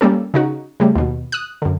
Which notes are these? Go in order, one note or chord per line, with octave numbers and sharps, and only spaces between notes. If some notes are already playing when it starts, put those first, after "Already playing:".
G3 A#3 C#4 A4
C#3 D#4 F#4
C#3 G3 A3
D#2 B2
D#6 F#6
F#2 D3